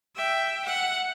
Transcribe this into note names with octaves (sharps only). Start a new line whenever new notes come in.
E5 G5
F#5